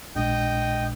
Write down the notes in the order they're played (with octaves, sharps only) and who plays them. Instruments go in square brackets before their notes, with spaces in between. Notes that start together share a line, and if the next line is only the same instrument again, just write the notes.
[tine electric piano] A#1 A#2 G#3 D4 [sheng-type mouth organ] D#5 G5